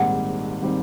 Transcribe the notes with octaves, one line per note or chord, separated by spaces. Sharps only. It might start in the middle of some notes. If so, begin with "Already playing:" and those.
Already playing: A#1 G#2 D#3 G3 C4 F#5
D#3 G3 C4